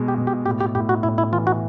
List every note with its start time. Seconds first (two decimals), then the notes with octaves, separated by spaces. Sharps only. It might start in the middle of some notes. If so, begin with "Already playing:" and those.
Already playing: B2 G#3 B3
0.08 G4
0.18 B2
0.27 G4
0.46 A2 G4
0.61 G4
0.75 A2 G4
0.89 F#4
1.03 A2 E4
1.18 E4
1.32 E3 F4
1.47 F#4